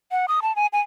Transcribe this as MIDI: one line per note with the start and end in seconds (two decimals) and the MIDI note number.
0.11 0.26 78
0.28 0.40 87
0.42 0.54 81
0.56 0.67 80
0.73 0.81 80